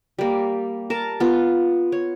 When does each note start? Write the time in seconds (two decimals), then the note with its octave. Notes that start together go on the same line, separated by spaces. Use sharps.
0.18 G3 A#3
0.90 A#4 A5
1.20 B3 F4
1.92 C#5